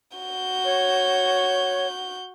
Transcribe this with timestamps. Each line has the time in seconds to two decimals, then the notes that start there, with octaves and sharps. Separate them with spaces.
0.17 F#4 G6
0.65 C#5